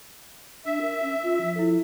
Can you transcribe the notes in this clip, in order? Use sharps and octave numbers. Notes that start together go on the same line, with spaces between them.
D4 E5
A#4
C#4
F4
F3
E4 A4